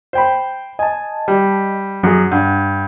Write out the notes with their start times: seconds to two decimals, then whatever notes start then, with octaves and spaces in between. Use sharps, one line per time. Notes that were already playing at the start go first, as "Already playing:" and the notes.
0.13 C5 G5 B5
0.79 D#5 G#5 A5
1.28 G3
2.03 F#2 F#3 G#4
2.31 G2 F#5